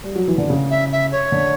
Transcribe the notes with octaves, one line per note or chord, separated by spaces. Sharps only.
G3
F#3
E3
D3
C#3
E5
E5
C#5
D3